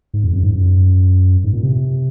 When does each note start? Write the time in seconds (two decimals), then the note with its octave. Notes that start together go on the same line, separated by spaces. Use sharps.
0.14 G#2
0.24 F2
0.33 F#2
0.43 G#2
0.53 F#2
1.44 G#2
1.53 A#2
1.63 C3